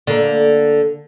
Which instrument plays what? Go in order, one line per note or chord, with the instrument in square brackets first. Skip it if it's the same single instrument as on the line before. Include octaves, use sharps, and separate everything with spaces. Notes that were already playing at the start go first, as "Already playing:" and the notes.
[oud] D3 A#3